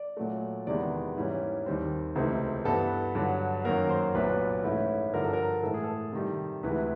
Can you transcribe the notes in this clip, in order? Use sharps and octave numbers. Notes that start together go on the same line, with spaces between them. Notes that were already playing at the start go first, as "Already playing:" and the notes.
Already playing: D5
A#2 F#3 A3
E2 C3 D#3 G#3 B3 D5
G#2 E3 G3 A#3 C#4
D#2 D#3 G3 C4
C#2 C3 E3 A3 C4
G2 E3 G3 B3 A4
G2 D3 F#3
F#2 D#3 F#3 A#3 A#4
C5
C2 A#2 F#3 B3 B4
G#2 E3 A3 C#4 E4
G2 D3 F3 A#4
A4
A#4
A2 E3 G#3 A4
G#4
A4
C3 D#3 G3
D2 C3 E3 G#3 B4